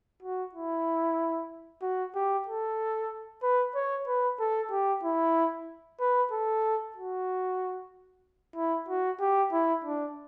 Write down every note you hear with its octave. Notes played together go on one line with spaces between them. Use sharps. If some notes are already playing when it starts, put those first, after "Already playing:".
F#4
E4
F#4
G4
A4
B4
C#5
B4
A4
G4
E4
B4
A4
F#4
E4
F#4
G4
E4
D4